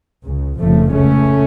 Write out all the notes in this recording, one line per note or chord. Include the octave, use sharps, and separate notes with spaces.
C#2 C#3
F1 F2 C#3 F3 A3
C#2 C#3 A3 C#4